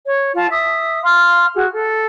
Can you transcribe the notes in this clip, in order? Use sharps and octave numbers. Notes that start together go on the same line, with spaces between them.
C#5
F4 A5
E5 D#6
F5 C6 F6
F#4 G#4
A4